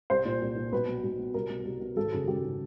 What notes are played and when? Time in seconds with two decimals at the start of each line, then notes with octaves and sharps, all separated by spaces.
0.10 C2 C5
0.25 A#2
0.41 C2
0.56 A#2
0.72 B1 B4
0.88 B2
1.03 B1
1.19 B2
1.34 C2 A#4
1.50 B2
1.65 C2
1.81 B2
1.96 G#1 A4
2.12 F#2 C#3 G#4
2.28 G#1 G4
2.44 C#3